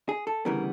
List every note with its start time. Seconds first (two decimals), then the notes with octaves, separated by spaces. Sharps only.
0.09 G#4
0.27 A4
0.45 D2 C#3 E3 G3 B3 A#4